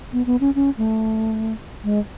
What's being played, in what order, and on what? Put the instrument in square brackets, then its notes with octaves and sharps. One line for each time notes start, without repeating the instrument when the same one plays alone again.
[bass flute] B3
B3
C#4
C#4
A3
G#3